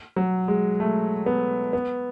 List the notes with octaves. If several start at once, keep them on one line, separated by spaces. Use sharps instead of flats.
F#3
G#3
A3
B3
B3